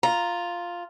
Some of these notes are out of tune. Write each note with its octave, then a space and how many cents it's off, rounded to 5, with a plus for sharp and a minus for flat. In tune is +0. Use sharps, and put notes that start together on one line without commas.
F4 +0 A#5 +0